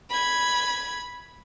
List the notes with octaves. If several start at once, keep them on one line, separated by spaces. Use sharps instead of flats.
B5 G#6